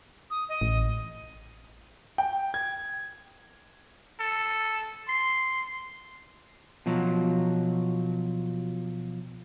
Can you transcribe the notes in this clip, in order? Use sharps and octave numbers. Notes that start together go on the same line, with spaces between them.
D#6
D#5
A1
G5
G#6
A4
C6
B2 F3 F#3